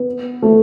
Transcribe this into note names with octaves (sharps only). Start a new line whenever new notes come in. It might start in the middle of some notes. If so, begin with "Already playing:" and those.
Already playing: B3
A3